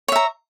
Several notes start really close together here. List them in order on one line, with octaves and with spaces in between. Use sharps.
C#5 E5 A#5